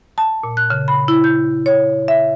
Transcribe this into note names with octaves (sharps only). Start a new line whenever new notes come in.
A5
A#2
F#6
C#3
B5
E4
G6
C#5
E5